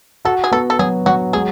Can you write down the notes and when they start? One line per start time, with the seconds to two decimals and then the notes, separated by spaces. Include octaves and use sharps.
0.25 F#4 A4
0.44 G#4
0.52 B3 A4
0.70 A4
0.79 F#3 G#4
1.06 F#3 F#4
1.33 G#3 G#4